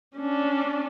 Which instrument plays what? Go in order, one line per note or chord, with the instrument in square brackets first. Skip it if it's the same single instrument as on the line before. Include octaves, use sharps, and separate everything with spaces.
[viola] C#4 D4